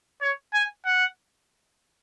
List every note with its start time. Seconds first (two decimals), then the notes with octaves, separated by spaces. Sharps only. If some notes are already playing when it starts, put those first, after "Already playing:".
0.21 C#5
0.54 G#5
0.85 F#5